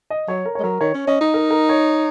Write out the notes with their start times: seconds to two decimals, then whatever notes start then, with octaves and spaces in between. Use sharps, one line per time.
0.10 D#5
0.28 F#3 C#5
0.46 A#4
0.55 C#5
0.59 G#3
0.63 F#3 A#4
0.81 D#3 C#5
0.94 C#4
1.07 C#4 D#5
1.21 D#4
1.34 A#4
1.51 A#4
1.69 C#5